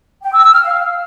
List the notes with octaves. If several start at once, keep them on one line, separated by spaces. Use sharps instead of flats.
G5
E6
E6
F6
F5